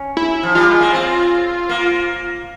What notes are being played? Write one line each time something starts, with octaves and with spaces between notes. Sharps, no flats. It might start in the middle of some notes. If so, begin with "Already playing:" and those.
Already playing: C#4
E4
F3
G3 F4
G#3
A#3
C4
A#3